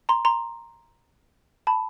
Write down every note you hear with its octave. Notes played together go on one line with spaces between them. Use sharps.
A#5 C6
A#5 C6
A5 B5